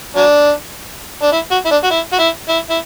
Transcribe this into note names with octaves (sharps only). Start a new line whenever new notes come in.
F#3 D4
D4
E4
F#4
E4
D4
F#4
E4
F#4
E4
E4
E4